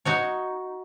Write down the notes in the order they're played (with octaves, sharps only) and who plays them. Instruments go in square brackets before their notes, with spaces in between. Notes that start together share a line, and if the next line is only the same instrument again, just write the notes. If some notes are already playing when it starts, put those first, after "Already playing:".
[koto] D#4 F#4 C#5